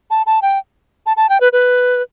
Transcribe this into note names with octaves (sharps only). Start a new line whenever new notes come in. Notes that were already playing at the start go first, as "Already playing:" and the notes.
A5
A5
G5
A5
A5
G5
B4
B4